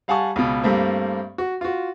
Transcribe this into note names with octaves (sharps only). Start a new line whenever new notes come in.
G3 F5 F#5 G#5 A5 C#6
C#2 B2
G2 G3 A3 A#3 C4
F#4
F4 F#4